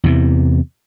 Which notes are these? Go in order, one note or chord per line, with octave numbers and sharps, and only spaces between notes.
E2 C3 E3